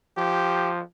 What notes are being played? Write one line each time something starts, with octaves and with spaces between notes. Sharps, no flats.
F3 G4